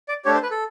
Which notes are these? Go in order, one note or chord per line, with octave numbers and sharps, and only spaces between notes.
D5
A3 D4 G4 C#5
C5
B4
A4